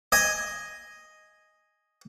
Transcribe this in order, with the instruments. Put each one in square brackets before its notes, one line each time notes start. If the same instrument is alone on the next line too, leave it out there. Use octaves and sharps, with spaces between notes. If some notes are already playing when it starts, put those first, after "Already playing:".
[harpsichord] D#5 G#5 D#6